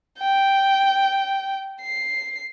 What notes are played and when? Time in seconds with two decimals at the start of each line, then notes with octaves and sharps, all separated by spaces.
0.19 G5
1.82 C7